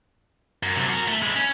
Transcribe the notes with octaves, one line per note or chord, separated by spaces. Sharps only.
F#2
C3 F#3
F#4 A#4
A3
G#3 E4
C#4